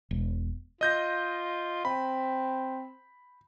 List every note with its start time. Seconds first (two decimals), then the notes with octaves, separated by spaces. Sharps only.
0.11 E1
0.81 F4 D#5 G6 A#6
1.85 C4 B5